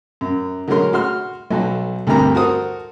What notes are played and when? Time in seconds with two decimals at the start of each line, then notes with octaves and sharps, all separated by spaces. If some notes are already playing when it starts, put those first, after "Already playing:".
0.21 F#2
0.68 D3 F#3 G#3 C#4 A#4 C6
0.93 F#4 C6 F6
1.50 B1 F#3 A4
2.07 D2 G2 C3 G3 A#4 A#5
2.35 F#4 A4 A#4 C5 D#6